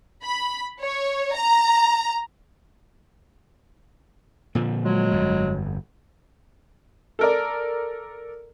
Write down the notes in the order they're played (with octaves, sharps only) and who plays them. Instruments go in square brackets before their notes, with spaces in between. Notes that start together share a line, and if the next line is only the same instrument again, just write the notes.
[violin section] B5
C#5
A#5
[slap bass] A#2 D3 F3
[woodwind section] F#3 G#3
[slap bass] G1 F2
[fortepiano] A4 A#4 D5